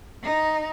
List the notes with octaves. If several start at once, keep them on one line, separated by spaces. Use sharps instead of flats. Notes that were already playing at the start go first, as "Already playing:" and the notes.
D#4